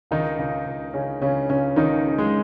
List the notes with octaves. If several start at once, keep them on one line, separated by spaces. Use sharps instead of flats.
C#2 D#3 D#4
C#2
C#2
C#2 C#3 C#4
C#2 C#3 C#4
C#2 C#3 C#4
C#2 D#3 D#4
C#3
G#3 G#4